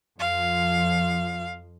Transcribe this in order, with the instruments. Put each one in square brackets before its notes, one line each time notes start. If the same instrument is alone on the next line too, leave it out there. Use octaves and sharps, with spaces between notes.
[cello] F2 F3 [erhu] F5